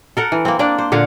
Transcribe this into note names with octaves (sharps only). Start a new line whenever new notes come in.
A4 A#4 F#5
E3
A#3 C4
A#3 D4 D5
C5
A#2 D3 F5 F#5